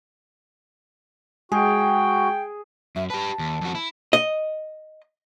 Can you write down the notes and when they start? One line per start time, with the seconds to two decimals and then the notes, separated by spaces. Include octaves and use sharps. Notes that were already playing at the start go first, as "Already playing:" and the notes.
1.52 G#3 F#4 G#4 G5
2.96 F#2 E5
3.10 G4 B4 A5
3.39 D#2
3.61 F2 F#4
3.75 E4
4.13 D#5